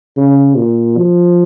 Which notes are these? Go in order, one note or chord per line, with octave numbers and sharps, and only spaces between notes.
C#3
A#2
F3